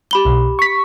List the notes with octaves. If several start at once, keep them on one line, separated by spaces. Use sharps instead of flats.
G4 B5 G7
B1
C#6 B6